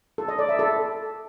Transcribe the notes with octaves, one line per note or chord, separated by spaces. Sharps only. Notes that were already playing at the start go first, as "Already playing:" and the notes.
A4
D#5
D5
E5
A4